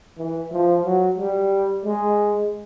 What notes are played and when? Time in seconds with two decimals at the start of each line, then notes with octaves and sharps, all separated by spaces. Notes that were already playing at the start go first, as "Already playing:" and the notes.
0.18 E3
0.51 F3
0.85 F#3
1.18 G3
1.85 G#3